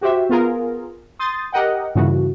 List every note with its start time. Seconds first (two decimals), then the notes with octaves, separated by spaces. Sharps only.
0.01 F#4 G4 C5 E5
0.29 B3 F4 G#4 A#4
1.19 C6 D#6 G6 A6
1.53 G4 A#4 D#5 F#5 G5
1.95 G2 A#2 C#3 E3 F#4